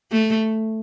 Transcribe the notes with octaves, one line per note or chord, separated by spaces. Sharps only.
A3